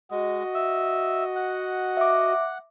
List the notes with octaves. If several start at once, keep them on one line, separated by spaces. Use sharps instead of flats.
G#3 F#4 D#5
E5
F#5
E5 D6